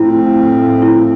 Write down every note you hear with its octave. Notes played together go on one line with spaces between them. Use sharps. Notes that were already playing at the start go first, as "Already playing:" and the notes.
Already playing: A2 F3 A3 C4 E4
E4